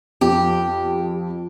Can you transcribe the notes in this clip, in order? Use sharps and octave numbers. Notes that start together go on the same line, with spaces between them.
F2 G4